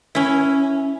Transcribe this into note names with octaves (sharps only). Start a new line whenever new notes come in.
C#4 E4